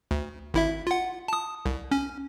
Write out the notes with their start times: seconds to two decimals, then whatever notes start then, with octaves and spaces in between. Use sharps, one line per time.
0.11 D2
0.54 G#1 E4 E5
0.87 F4 F#5
1.28 A5 D#6
1.66 C2
1.91 C#4